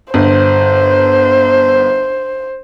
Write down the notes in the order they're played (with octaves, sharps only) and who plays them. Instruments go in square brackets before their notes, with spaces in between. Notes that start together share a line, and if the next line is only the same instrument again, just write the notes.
[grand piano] G1 [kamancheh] C5